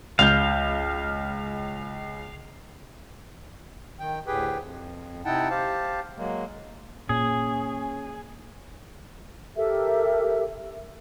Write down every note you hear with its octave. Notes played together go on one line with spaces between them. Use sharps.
C#2 F5 G6
D#3 G5
D2 A2 G4 G#4 B4 G5
F2
C3 D#4 E4 F#5 G5 A5
G4 C5 F5 A5
F#3 G#3 A#3
A#2 C#4 G#4
G4 A4 A#4 E5